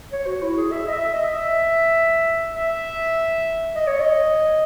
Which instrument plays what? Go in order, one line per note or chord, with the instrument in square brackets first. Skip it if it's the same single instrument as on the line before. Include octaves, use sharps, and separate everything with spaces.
[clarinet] C#5
F#4
E4
G#4
E5
D#5
E5
D#5
E5
E5
D#5
C#5
D#5